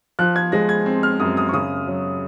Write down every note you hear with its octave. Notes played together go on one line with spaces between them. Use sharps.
F3 F#6
G#6
G#3 A#6
G#6
C4
F6
F#2 D#6
D#6
C#6
C#3 D#6
F#3